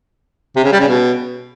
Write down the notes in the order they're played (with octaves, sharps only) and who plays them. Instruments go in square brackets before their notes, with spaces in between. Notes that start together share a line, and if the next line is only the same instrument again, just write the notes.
[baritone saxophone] C3
C#3
G3
C#3
B2